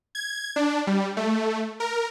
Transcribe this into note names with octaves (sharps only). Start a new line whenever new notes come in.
G#6
D4
G3
A3
A#4